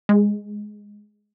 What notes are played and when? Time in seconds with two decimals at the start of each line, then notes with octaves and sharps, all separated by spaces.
0.09 G#3